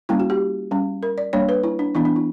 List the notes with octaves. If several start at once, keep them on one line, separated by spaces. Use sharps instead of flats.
G3 A#3 C#4 E4
F#4
G4
G3 C#4
A#4
D5
G3 A#3 D4 C#5
B4
E4
D4
E3 B3 D4 E4
D4
E4